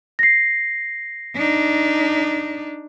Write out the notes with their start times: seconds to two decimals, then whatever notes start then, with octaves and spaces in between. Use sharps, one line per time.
0.19 A#6 C7
1.36 D4 D#4